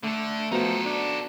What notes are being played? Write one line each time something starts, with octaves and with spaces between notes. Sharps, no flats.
D3 A3 A4
F3 B3 D#4 F#4 A4
D4